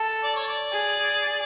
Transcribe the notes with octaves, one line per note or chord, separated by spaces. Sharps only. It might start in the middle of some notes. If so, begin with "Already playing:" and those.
Already playing: A4
D5
C#5
D5
G#4